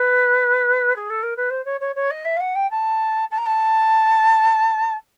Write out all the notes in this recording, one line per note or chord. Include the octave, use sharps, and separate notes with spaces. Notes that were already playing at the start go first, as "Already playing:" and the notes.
Already playing: B4
G#4
A4
A#4
B4
C5
C#5
C#5
C#5
D#5
E5
F5
F#5
G5
A5
A5
A#5
A5